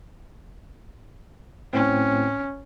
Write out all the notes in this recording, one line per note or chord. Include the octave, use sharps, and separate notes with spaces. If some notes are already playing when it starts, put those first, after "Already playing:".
A2 C4 C#4